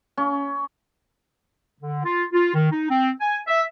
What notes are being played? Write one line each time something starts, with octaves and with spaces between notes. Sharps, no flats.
C#4
D3
F4
F4
D#3
D#4
C4
G#5
E5